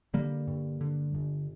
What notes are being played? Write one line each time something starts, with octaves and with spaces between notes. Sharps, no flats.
D3 G3 A#3
G2
D3
G1